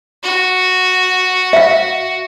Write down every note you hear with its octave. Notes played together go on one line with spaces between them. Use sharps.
F#4
E5 F5